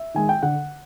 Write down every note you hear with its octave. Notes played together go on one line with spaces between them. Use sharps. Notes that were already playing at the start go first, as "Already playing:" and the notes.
Already playing: E5
D#3 G#3 G#5
G5
D3 F#5